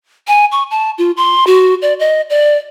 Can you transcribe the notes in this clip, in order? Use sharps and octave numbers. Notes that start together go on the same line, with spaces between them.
G#5
C#6
A5
F4
C6
F#4
D5
D#5
D5